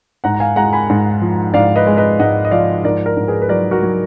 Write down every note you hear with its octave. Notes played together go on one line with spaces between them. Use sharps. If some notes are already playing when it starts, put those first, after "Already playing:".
G#2 F#5 A#5
A#5
F5 G#5
G#3 F#5 A#5
G#5 B5
G#2
F3
G#2 D5 F5
B4 D#5
G#3
B4 D#5
G#2 D#5 F#5
D#5
F3 D5 F5
G#2 A#4 D5
A#4 D5
G#2
G#4 B4
B4
F#3 A#4 D5
F#4 A#4
F#3